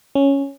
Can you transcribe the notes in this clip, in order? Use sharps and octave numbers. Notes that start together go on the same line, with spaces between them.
C#4